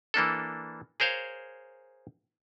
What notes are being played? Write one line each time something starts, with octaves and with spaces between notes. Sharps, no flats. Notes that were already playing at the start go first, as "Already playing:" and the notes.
E3 A#3 D4 A4
G#4 A#4 C5 C#5 F5